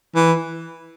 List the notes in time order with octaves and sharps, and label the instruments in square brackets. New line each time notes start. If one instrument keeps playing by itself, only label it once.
[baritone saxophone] E3